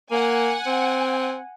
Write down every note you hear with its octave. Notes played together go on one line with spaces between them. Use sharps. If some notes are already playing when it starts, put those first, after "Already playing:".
A#3 F#5 G#5
C4